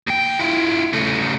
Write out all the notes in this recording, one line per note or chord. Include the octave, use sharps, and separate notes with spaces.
D#2 G5
E4 F4
C#3 A3